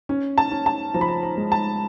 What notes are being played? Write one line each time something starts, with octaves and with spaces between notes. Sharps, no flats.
C#4
A5
C#4
A5
F3 A#5
B5
A#5
A#5
G#3
A5